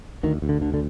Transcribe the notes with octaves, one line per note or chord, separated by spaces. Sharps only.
D2 D#3
D2
D3
D3
D3